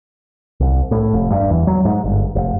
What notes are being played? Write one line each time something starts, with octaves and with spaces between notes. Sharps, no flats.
C2
A2
F1
G2
E2
F#3
G#2
G1
F1